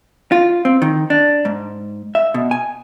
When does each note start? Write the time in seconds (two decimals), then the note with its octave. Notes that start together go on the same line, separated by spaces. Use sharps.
0.32 F4
0.65 C4
0.82 D#3
1.10 D4
1.45 G#2
2.15 E5
2.34 B2
2.51 G#5